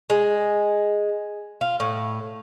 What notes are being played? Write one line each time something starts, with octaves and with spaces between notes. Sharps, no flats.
G#3
F4
A2